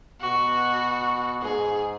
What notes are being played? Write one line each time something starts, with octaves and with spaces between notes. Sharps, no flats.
B2 F#4
G#2 G#4